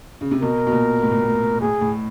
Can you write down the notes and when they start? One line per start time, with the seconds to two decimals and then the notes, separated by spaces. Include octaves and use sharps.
0.21 C#3
0.31 C3
0.42 B2 A#4
0.67 B2
0.72 A#2
1.02 A2
1.11 A#2
1.22 A2
1.61 A2 G#4
1.81 A2